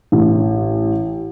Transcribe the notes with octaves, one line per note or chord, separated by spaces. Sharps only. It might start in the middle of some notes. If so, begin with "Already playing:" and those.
A1